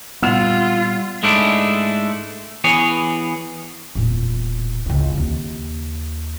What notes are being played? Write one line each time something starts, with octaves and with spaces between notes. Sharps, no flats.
A#2 G3 B3 F4 F#5 E6 F7
G#2 G#3 A3 D4 E4
E3 B3 G#4 C#5
E1 A#2
C#2 E4
D#2